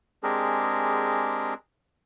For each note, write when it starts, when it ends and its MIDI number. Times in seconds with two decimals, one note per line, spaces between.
0.23 1.54 56
0.23 1.54 60
0.23 1.54 62
0.23 1.54 67
0.23 1.54 68
0.23 1.54 70